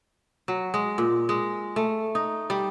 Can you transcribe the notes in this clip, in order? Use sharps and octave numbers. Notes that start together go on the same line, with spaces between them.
F#3
G#3
A#2
G#3
A3
D#4
G3